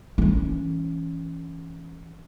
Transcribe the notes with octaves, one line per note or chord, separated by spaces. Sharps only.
E3 C#4